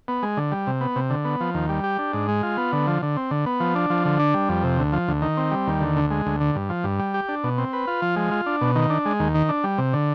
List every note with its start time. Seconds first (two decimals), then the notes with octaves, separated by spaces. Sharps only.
0.08 B3
0.23 G#3
0.37 D3
0.52 G3
0.67 C3
0.81 B3
0.96 C3
1.10 D3
1.25 B3
1.41 F3
1.55 D#2
1.69 G3
1.84 G4
1.99 D4
2.13 G#2
2.28 G#3
2.43 F4
2.57 B3
2.73 D3
2.87 F3
3.02 D3
3.17 C4
3.31 D3
3.46 B3
3.60 F3
3.75 D4
3.90 F3
4.05 D3
4.19 D4
4.34 G3
4.49 F2
4.64 C3
4.79 D2
4.93 F3
5.08 D2
5.22 D#3
5.37 C4
5.51 G3
5.67 D#2
5.81 D3
5.96 D2
6.11 G#3
6.26 D2
6.41 D3
6.55 G2
6.69 F3
6.84 G2
7.00 G3
7.14 G4
7.29 D4
7.44 B2
7.58 C4
7.73 B4
7.87 F4
8.02 F3
8.16 G#3
8.31 F4
8.46 D4
8.61 B2
8.75 D#3
8.90 D4
9.05 G#3
9.20 D#2
9.35 D#3
9.49 D4
9.64 G3
9.78 C3
9.93 D3